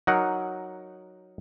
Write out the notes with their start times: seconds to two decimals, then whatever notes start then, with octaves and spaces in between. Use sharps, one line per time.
0.07 F#3 D#4 A#4 F#5